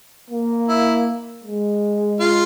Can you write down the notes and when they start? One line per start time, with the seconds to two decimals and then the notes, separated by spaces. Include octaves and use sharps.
0.31 A#3
0.68 E4
1.44 G#3
2.20 F4